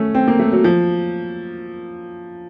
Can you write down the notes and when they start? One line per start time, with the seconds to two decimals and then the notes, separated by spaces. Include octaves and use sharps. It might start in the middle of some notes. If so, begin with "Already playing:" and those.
Already playing: A3 C#4
0.15 C4
0.28 A#3
0.39 A3
0.52 F#3
0.64 F3